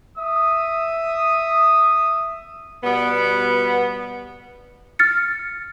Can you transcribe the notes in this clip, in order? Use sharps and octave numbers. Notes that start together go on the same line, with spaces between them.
E5 D#6
B2 G3 B3
F6 A6 C#7